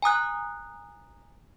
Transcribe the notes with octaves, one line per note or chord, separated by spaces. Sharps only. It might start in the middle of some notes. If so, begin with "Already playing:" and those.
G#5 A#5 D#6 F#6